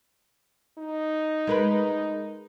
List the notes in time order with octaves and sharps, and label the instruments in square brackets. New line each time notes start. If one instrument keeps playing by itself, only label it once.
[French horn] D#4
[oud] G#3 A#4 B4